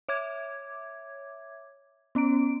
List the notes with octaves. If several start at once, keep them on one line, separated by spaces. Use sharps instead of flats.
C#5 E5 D6 G#6
B3 C#4 A#5 D7